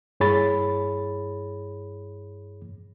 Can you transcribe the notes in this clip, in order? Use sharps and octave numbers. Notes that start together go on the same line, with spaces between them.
G2 E4 G#4 C#5 B5 A6